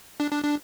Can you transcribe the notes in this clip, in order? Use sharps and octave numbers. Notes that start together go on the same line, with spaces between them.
D4
D4
D4